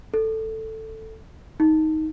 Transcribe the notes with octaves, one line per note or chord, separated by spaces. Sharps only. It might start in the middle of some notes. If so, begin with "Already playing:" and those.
A4
D#4